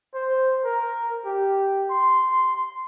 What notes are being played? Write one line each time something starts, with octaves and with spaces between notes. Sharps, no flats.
C5
A#4
G4
C6